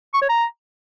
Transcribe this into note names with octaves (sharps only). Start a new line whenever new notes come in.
C#6
C#5
A#5